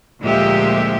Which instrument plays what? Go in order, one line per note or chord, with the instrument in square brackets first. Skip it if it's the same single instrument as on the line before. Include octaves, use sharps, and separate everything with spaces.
[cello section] D2 A#2 F3 G#3 G4 E5